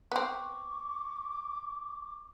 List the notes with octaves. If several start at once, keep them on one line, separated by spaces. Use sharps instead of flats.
B3 C4 C#6 D6